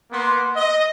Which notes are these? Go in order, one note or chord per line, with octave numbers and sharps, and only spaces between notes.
A#3 B3 C6
D#5